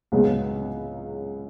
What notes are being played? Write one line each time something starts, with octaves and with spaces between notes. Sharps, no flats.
C#2 C#3 F#3 B3